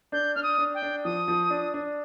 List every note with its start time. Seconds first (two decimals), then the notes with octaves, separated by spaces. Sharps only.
0.12 D4 G6
0.35 D4 F6
0.43 D#6
0.58 D4
0.74 G5
0.82 D4
1.04 F3 D#6
1.28 F3
1.50 D4
1.74 D4